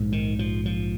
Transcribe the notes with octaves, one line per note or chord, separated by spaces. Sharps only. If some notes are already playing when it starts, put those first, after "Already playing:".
Already playing: A#1 G#2
D#3
F3
F3